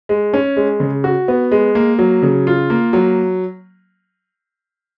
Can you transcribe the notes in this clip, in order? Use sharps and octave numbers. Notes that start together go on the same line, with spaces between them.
G#3
C#4
G#3
C#3
F#4
B3
G#3
A#3
F#3
C#3
F4
A#3
F#3